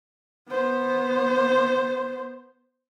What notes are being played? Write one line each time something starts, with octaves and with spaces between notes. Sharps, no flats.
B3 C5